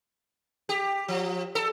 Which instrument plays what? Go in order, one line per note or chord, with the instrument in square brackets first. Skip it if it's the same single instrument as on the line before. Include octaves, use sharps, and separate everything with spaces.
[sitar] G4
F3
A4